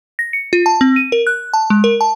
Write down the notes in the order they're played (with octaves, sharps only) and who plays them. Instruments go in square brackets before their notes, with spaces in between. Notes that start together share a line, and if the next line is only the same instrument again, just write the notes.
[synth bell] A#6
C#7
F4
A5
C4
D#7
A#4
F#6
A5
G#3
A#4
A5